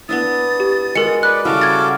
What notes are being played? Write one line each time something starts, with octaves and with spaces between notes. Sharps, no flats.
B3 D4 E4 D#6 A6
G4
G#3 F#4 A#4 C#7
B4 D5 F#6
C#3 G3 E4 F#4 A4 D6 F6
G#6 A6